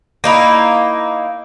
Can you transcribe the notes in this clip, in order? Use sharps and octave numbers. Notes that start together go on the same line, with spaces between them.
A#3 D#4 E4